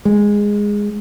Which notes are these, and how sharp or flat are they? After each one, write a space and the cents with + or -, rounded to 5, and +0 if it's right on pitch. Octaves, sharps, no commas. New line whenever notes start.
G#3 -10